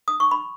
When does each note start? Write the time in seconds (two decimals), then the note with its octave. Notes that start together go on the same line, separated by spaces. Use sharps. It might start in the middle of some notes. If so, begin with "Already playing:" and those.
0.08 D#6
0.20 C#6
0.31 B5